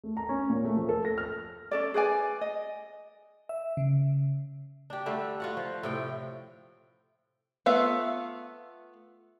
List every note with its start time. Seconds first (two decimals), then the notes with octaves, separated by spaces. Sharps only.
0.04 A3
0.17 A#5
0.29 C#4
0.50 A#2
0.65 A3
0.77 F3
0.89 A4
1.05 A#6
1.18 F6
1.71 C#4 A4 D5
1.94 G#4 B4 D5 G#5
2.41 D#5
3.49 E5
3.77 C#3
4.90 D4 G4
5.06 D3 G3 A3
5.40 F4 F#4 F#5
5.57 F3
5.83 A2 C3 G5
7.66 A3 B3 F4 E5 F5